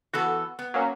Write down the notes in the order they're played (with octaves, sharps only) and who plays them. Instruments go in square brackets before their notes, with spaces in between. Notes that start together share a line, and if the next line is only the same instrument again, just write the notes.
[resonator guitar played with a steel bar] E3 B3 A4 [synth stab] F#4
[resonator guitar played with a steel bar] B3
[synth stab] F#3 A#3 C#4